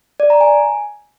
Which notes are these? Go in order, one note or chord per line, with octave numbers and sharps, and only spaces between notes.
D5
A#5
G#5